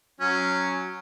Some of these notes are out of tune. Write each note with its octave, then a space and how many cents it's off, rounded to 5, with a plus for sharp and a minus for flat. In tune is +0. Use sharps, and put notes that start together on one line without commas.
F#3 -5 C#4 +0